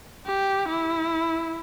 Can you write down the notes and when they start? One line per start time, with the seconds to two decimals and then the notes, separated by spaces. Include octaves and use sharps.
0.27 G4
0.69 E4